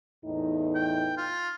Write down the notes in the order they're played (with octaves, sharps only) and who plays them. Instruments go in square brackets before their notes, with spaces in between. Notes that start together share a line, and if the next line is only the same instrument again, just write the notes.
[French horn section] E2 A2 D#4
[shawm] G5
F4